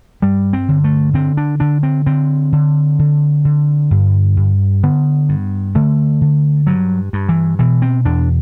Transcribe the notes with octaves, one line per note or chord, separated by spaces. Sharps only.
G2 G3
C4
D3
A3
D3 C4
D4
D3 D4
C4
D3 C4
D3
D3
D3
G2
G2
D3 B3
G2
D3 A3
D3
G2 F#3
G2
E3
B2 E3
C4
E2 D4